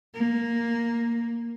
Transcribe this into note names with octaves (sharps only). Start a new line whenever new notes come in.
A#3